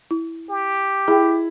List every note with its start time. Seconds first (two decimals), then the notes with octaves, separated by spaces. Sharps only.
0.11 E4
0.50 G4
1.08 E4 G#4 G5